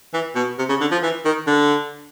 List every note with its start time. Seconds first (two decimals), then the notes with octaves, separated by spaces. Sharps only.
0.14 E3
0.36 B2
0.59 C3
0.69 C#3
0.81 D3
0.92 F3
1.03 E3
1.25 D#3
1.47 D3